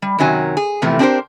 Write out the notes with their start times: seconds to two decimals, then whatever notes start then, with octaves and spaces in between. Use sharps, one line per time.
0.02 G3
0.19 F#2 C3 D#3 F#3 G#5
0.57 G#4
0.82 E2 A2 C3 E3 F3 A3
0.99 C4 D4 G4 G#4 A#4 C5